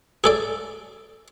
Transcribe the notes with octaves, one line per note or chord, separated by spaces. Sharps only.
G#4 A4 D5